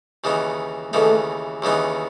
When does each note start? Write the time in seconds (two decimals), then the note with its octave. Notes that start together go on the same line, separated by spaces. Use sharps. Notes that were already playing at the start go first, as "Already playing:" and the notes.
0.24 D#2 C#3 E3 B3 D#4
0.93 D#2 C#3 E3 A3 B3 D#4
1.62 D#2 C#3 E3 B3 D#4